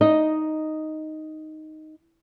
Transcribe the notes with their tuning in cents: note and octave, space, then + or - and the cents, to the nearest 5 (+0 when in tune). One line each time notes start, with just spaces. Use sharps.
D#4 +0 D#5 +0